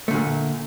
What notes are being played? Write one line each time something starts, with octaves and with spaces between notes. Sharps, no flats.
A#2 D3 A3